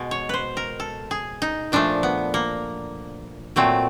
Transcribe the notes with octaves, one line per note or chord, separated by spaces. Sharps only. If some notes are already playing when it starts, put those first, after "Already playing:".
Already playing: B2 G#3
C#5
B4 C5
A#4
A4
G#4
D#4
A#2 F3 A3 D4
B3
A#3
A#2 F#3 A3 C4